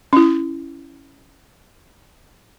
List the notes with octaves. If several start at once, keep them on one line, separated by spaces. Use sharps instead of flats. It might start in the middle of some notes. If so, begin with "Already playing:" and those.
C#4 E4